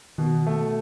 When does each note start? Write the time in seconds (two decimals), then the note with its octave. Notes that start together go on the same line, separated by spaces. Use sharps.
0.18 B2 D#3
0.46 A3